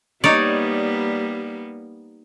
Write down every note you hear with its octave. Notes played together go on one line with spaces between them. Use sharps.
G3 A#3 B3 D#4 C#5 D5